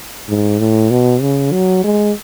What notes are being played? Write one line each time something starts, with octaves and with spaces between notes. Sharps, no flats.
G#2
A2
B2
C#3
F#3
G#3